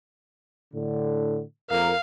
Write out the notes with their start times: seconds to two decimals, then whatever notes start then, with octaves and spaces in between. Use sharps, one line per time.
0.74 A2 D3
1.70 F2 A#4 F5